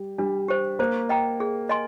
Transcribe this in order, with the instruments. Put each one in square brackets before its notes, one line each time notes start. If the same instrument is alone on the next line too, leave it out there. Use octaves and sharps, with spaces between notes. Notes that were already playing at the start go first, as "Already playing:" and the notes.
Already playing: [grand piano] G3
[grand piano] G3 [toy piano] D4
[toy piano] G4 C5
[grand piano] A#3 [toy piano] C5
[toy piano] D#5 G5 A#5
G#4
D#5 G#5 C6